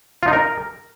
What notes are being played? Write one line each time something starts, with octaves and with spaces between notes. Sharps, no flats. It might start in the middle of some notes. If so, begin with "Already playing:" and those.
F4
D#4
A#4